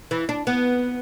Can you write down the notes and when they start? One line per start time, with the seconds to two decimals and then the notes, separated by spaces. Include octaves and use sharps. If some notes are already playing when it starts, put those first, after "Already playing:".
0.11 E3
0.29 D4
0.47 B3